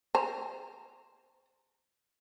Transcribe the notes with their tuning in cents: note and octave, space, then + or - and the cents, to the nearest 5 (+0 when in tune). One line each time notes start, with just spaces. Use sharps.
C5 +0 A#5 -25